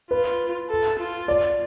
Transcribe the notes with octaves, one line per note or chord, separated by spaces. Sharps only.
F4 B4
A4
F4
D5